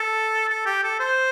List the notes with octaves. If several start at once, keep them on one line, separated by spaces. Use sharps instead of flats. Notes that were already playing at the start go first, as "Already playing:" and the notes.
Already playing: A4
A4
G4
A4
C5